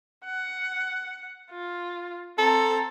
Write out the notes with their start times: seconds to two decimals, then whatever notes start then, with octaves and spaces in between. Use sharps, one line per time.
0.24 F#5
1.51 F4
2.38 C4 A4 A#5